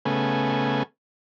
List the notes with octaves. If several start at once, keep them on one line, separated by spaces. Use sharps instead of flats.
C#3 A3 B3 G#5